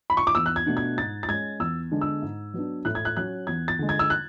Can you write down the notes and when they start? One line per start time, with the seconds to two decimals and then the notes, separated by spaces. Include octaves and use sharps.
0.10 B5
0.17 C#6
0.27 D6
0.35 E2 E6
0.46 F#6
0.56 G#6
0.66 B2 A3 D4
0.77 G#6
0.97 G#2 A6
1.23 A6
1.28 G#3 C#4 G#6
1.59 E2 E6
1.91 D3 G#3 B3 D4
2.01 E6
2.22 G#2
2.54 F#3 B3 D4
2.85 A2 F#6
2.95 G#6
3.05 F#6
3.17 F#3 C#4 F#6
3.47 E2 G#6
3.68 A6
3.79 D3 G#3
3.89 G#6
3.99 E6
4.10 F#6